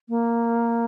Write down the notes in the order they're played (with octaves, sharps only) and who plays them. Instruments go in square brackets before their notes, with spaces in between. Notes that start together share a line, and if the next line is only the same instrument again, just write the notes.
[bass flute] A#3